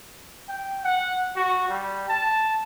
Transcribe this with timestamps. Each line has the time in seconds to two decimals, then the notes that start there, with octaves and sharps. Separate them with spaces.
0.48 G5
0.84 F#5
1.36 F#4
1.69 G3
2.09 A5